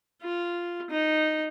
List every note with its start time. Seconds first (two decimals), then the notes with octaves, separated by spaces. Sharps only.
0.22 F4
0.90 D#4